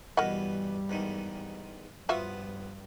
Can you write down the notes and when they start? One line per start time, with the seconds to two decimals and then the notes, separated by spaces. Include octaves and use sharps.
0.17 E2 G2 B2 E3 G3 A#4 D#5 F#5
0.89 E2 G#2 D#3
2.09 G2 F3 B3 F4 F#4 E5